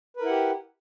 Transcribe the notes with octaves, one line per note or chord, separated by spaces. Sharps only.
E4 G4 A#4 B4 F#5